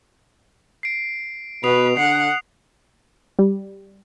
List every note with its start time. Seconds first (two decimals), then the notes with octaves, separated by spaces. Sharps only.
0.83 C7 D7
1.64 B2 B4 D#6 C7 F7
1.97 D3 F#5 C7
3.39 G3